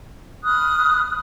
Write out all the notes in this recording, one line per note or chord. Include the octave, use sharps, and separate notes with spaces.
B5 D#6 F6 F#6